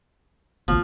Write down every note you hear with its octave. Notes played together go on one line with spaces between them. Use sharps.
A1 D2 B2 F3